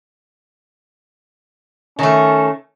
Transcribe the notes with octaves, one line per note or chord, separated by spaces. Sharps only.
D#3 A3 C#4